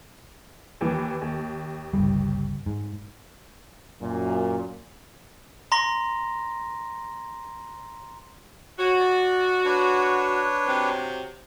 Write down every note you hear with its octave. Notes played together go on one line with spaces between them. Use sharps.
D#2 E3
D#2
G1 C#2 G3
G#2
F#2 A#2
A#5 C6 A#6
F#4 C#5
D5
D4 B4 C#5
C3 F#3 C4